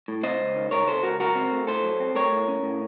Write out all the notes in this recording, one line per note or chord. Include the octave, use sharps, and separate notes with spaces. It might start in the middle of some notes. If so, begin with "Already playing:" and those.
A2
C3 C5 D#5
C#2
D#3
C#2 A#4 C#5
C3 A4 C5
C#2 F#4 A#4
F#3 F#4 A#4
C4
A3
A2 A4 C5
F#3
C4
A3 A#4 C#5
A2
C#4
A2